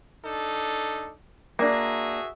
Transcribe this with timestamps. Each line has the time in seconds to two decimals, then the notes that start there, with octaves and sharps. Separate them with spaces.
0.24 D4 D#4 A4
1.59 A#3 D4 F#4 G#4 E5